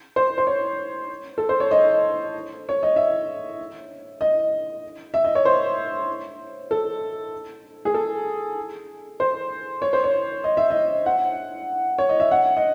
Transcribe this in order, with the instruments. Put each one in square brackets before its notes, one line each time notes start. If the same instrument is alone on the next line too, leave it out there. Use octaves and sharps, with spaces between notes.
[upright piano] C5
C5
C#5
A4
C5
C#5
D#5
C#5
D#5
E5
D#5
E5
D#5
C#5
C5
A4
G#4
A4
C5
C#5
C5
C#5
D#5
E5
D#5
F#5
C#5
D#5
E5
F#5
D#5